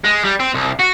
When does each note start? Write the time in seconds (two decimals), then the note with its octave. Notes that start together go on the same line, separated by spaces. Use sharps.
0.05 G#3
0.25 G3
0.40 C4
0.54 C2
0.79 F#4